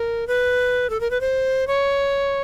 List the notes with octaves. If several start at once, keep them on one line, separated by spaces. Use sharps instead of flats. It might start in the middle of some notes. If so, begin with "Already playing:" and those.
Already playing: A#4
B4
A4
A#4
B4
C5
C#5